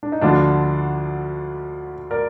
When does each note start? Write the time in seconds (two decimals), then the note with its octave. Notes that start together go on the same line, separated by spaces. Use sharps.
0.03 D4
0.12 D#4
0.21 D2 D3 F3 D4 F4
2.11 A#4 D5